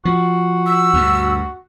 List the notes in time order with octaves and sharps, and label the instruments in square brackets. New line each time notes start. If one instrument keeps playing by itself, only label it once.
[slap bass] F3 [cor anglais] F#4
[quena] E6
[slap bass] D2 G2